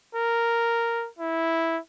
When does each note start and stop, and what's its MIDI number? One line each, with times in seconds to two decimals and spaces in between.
0.15 1.08 70
1.19 1.78 64